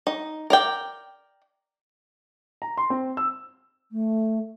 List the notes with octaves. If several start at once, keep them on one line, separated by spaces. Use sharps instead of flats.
D#4
A#4 D5 G5
A#5
C6
C4
E6
A3